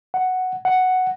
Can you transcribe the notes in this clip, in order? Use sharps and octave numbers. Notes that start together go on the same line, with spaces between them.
F#5
F#5